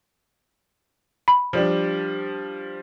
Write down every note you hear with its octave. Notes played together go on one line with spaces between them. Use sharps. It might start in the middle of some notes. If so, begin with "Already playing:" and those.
B5
F3 G3 D4